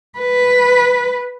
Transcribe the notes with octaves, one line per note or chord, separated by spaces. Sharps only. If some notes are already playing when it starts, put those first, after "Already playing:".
B4